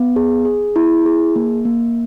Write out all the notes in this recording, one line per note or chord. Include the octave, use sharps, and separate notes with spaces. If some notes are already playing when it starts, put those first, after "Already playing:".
Already playing: B3
G#4
G#4
E4
G#4
A#3
A#3